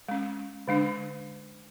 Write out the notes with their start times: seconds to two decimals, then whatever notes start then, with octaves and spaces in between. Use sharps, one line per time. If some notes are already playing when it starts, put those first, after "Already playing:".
0.09 G#3 C#4
0.68 D3 G#3 D4